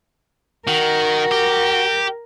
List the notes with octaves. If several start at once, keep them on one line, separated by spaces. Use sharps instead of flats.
D#3 F#4 A#4
G4